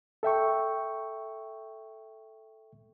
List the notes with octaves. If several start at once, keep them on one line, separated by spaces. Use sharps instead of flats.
A4 E5 G5 C#6